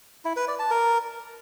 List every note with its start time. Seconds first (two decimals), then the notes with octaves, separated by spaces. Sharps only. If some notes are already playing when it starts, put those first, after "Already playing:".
0.25 E4
0.36 B4
0.48 D5
0.59 A5
0.71 A#4